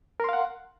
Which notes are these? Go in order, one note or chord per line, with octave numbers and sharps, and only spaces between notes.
A#4 F5 F#5 C6